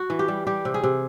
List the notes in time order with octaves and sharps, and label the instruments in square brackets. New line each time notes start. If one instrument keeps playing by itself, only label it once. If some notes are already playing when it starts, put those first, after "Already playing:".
Already playing: [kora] F#4
E3
G4
G3
G3 G4
C3
G#4
C3